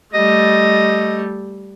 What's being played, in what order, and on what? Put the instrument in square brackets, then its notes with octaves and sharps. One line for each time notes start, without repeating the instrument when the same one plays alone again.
[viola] G3 A3 [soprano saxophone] D#5